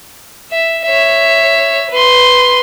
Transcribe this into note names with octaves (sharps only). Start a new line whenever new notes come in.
E5
C#5 E5
B4 C6